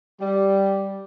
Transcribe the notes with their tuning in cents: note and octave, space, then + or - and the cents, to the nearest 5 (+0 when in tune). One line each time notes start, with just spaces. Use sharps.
G3 -5